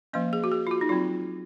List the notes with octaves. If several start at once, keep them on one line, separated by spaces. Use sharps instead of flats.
F3 A#3 C#4 D#5
G#4
F#4
G#4
F4
F#4
D#4
F#3 C4 F4